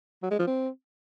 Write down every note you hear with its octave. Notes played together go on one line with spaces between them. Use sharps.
F#3
G#3
F3
C4